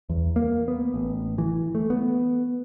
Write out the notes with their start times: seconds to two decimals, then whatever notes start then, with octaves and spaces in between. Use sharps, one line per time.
0.10 E2
0.36 A#3
0.68 B3
0.94 A1
1.38 E3
1.75 A3
1.90 B3